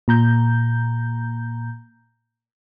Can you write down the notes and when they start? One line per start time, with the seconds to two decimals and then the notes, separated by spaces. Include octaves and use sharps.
0.08 A#2 A#5 G6